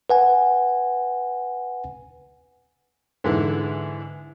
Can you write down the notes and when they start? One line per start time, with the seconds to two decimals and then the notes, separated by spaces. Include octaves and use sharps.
0.10 B4 F#5 G#5
3.24 G#2 D3 E3